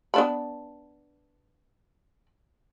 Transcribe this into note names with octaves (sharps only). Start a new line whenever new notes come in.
B3 D4 B5